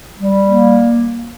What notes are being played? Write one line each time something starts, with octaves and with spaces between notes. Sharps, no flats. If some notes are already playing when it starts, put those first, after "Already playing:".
G3
A#3